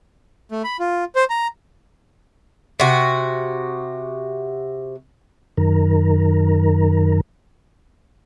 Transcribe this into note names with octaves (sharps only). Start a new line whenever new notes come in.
A3
B5
F4
C5
A#5
C3 F#4
F#2 D#3 A#4